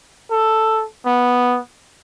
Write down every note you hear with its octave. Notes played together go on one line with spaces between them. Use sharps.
A4
B3